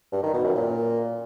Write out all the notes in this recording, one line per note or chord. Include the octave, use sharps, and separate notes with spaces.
G2
D#3
B2
F#2
A#2